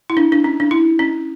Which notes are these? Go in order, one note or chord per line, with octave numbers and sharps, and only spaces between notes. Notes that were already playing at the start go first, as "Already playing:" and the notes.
E4
D4
D4
C#4
D4
E4
C#4